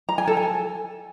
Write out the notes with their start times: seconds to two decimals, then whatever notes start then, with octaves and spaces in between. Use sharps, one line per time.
0.09 A#5
0.18 G#5
0.27 A4
0.37 G#5